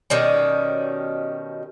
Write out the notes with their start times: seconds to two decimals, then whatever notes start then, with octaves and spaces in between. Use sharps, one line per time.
0.10 B2 D#3 G3 C#4